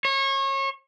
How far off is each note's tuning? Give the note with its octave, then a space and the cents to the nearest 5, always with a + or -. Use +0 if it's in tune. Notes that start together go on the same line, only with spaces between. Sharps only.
C#5 -30